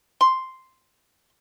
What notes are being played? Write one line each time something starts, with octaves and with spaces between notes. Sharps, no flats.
C6